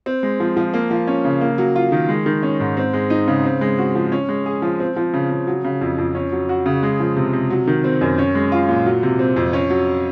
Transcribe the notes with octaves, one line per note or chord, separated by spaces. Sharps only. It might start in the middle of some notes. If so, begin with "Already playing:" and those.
C4
G#3
F3
F3
A#3
F3
C#4
C#3
A#3
F#3
F4
D#3
G#3
D#3
C#4
G#2
C4
G#3
D#4
C#3
C4
G#3
F#4
F3
C#4
G#3
G#4
F3
C4
F3
C#3
C#3
F#3
C#3
F2
F2
C#4
F#3
F#4
C#3
G#3
F3
C3
C3
F#3
D#3
C4
F#2
C#4
G#3
F4
A#2
F#3
C3
C4
F2
C#4
F#3